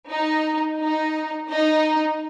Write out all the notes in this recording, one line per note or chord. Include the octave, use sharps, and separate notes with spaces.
D#4
D#4
D#4